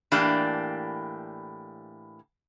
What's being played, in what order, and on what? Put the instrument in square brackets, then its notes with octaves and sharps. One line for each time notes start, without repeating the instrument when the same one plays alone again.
[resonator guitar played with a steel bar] A2 E3 A#3 D4 G4